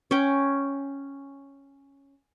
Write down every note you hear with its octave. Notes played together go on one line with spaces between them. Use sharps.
C#4 G5